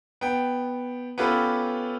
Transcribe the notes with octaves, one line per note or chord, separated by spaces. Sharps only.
B3 G5
B3 C#4 F4 G4 A4 B4